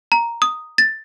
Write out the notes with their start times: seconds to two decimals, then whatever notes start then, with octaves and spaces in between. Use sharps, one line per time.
0.12 A#5
0.42 D#6
0.78 A6